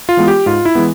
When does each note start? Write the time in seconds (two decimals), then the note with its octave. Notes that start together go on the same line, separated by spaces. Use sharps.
0.09 F4
0.17 E3 G#3 B3
0.28 G4
0.46 G#2 F4
0.65 E4
0.75 E3 G#3 B3